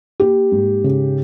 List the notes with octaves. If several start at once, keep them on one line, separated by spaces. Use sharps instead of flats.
A#3 G4
G#2
C#3